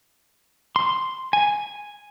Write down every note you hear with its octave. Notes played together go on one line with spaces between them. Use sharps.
C6
G#5